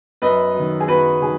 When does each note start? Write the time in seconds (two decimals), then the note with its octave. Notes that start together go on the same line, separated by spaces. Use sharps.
0.22 F#2 B4 D#5
0.55 D#3 F#3
0.80 G#4
0.88 F#2 F#4 B4
1.22 D#3 F#3 G#4